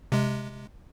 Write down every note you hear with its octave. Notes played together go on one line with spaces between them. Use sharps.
C3 G#3